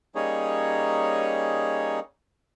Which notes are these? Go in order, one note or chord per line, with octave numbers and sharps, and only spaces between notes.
G3 A#3 C#4 D#4 G#4 C#5